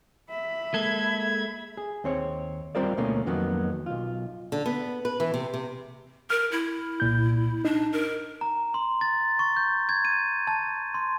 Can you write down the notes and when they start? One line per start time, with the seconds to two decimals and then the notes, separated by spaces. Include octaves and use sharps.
0.30 E5 B5
0.74 G#3 A#3 A4 G#6
1.77 G#4
2.04 D#2 C4 C#5
2.75 G3 C4 F4 A#4 C5 D5
2.97 D2 B2 A3 A#3 C#4
3.26 F2 D#3 F#3 A#3 B3
3.86 B1 F4
4.52 D3
4.66 B3
5.05 B4
5.20 E3
5.34 C3
5.54 C3
6.30 A#4 F6
6.52 E4
7.00 C2 A#2 G6
7.65 D4 D#4
7.93 A#4
8.41 A#5
8.74 C6
9.01 A6
9.39 C#6
9.57 G6
9.89 G#6
10.05 D#7
10.47 A5
10.94 C6